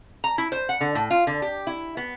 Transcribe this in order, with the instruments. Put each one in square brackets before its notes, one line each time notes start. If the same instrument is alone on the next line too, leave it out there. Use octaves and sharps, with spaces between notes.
[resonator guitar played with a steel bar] A#5
E4
C5
F#5
D3
A2
F4
D3
G4
E4
B3